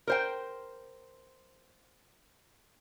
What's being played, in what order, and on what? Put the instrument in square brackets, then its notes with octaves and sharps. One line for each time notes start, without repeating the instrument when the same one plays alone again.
[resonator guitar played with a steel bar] A#4 C5 G5